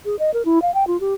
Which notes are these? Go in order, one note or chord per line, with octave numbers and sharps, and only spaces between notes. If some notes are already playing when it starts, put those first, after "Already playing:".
G#4
D#5
A#4
E4
F5
G5
F4
G4